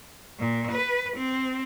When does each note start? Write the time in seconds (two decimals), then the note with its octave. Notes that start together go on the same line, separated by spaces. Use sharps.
0.39 A#2
0.71 B4
1.17 C4